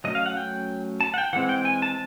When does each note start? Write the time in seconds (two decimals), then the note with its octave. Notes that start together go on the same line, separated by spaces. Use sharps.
0.04 F#3 A3 C#4 D#5
0.15 F5
0.26 F#5
0.37 G5
1.01 A5
1.14 F#5
1.18 G5
1.33 E3 G#3 C4 F#5
1.49 G5
1.65 G#5
1.82 A5